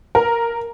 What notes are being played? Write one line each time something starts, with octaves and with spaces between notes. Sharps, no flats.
A#4